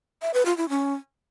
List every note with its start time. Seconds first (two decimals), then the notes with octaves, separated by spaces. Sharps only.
0.22 E5
0.34 B4
0.45 F4
0.57 E4
0.69 C#4